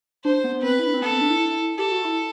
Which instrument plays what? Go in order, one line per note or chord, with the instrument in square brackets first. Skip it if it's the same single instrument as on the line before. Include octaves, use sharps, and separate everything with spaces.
[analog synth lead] D4 [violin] C5
[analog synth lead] B3
[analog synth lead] C4 [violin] B4
[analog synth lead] E4
D4
C4
[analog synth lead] B3 [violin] A4
[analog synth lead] C4
D4
E4
[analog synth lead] G4 [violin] A4
[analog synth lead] F#4
E4